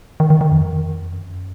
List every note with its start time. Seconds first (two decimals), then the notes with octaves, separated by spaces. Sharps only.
0.20 D#3
0.30 D#3
0.41 D#3
0.52 F2
1.14 F#2